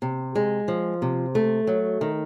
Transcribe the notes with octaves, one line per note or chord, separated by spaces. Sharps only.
C3
G#3
F3
C3
A3
F#3
D#3